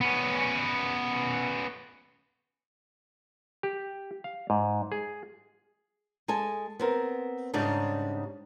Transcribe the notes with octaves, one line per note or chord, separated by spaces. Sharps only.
B3 C#4
G4
F5
G#2
G#4
G#3 A4 G#5 A5
B3 C4 A#4
G#2 C#3 G3 D4 D#4